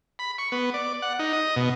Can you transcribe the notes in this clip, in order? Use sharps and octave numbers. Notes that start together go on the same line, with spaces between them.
B5
C#6
B3
D5
F#5
D#4
D#5
B2